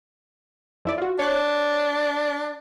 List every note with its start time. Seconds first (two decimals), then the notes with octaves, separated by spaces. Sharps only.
0.85 F2 E4 D5
0.98 F4 F#4
1.19 D4 C#5 F#6